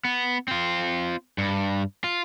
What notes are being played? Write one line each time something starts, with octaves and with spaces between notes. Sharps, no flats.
B3
C4 F4
G2
F4